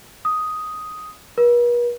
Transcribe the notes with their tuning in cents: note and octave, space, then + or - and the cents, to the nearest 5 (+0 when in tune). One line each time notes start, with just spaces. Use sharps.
D#6 +5
B4 -45